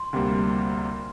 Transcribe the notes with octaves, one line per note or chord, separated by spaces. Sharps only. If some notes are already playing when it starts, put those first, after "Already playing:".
Already playing: C6
D2 C3 G3 A#3